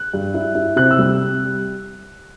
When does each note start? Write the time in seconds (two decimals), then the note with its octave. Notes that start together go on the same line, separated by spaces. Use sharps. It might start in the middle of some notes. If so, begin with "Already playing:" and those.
Already playing: F#6
0.14 G2
0.34 E4
0.55 E4
0.76 C3 F#6
0.91 E6
0.99 G3